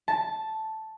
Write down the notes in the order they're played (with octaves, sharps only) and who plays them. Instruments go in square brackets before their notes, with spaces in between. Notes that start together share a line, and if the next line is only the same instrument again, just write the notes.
[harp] A5